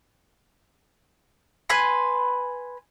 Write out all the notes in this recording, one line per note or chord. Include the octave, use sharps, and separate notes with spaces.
B4 G#5 C6